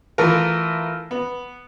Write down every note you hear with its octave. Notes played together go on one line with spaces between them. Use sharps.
E3 A3 F4 A#4
B3